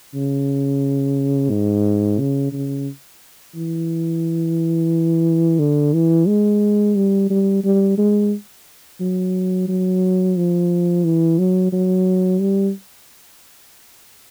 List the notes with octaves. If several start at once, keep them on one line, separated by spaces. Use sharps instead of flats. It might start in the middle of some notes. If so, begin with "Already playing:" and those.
C#3
G#2
C#3
C#3
E3
D3
E3
G#3
G3
G3
G3
G#3
F#3
F#3
F3
E3
F#3
F#3
G3